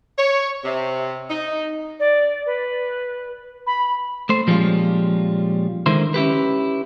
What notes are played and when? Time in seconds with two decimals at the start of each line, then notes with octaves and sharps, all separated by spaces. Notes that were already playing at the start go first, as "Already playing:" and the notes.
0.18 C#5
0.64 C3
1.29 D#4
2.00 D5
2.46 B4
3.67 B5
4.29 A3 C5
4.47 A#2 F3 G3 G#3 C#4 F4
5.86 D3 D#3 G#3 E4 A#4 C5
6.14 C#4 E4 G4 B4